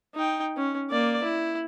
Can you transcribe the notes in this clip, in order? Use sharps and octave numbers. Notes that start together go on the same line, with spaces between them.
D#4 G5
C#4
A#3 D5
E4